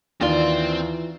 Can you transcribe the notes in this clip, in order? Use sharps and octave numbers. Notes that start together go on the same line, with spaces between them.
D#2 E3 C4 F4 D5 C6